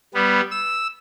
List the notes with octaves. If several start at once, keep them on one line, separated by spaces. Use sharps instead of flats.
G3 B3
E6